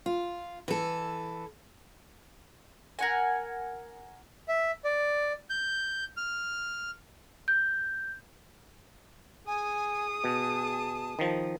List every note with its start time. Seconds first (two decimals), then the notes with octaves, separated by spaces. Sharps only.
0.06 F4
0.68 E3 A4
2.99 A#4 F#5 G#5
4.48 E5
4.85 D5
5.50 G6
6.17 F6
7.48 G6
9.47 G#4 G#5 D#6
10.24 B2 A5
11.19 D#3 F3